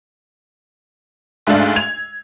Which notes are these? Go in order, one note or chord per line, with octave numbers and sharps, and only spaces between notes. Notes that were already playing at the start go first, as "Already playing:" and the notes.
D2 G#2 A3 D4 F5
G#6 F7